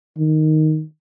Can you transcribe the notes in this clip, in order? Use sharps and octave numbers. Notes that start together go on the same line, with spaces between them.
D#3